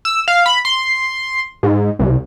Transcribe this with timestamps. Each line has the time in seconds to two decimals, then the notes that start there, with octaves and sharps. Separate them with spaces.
0.05 E6
0.28 F5
0.46 B5
0.65 C6
1.63 G#2
1.99 C2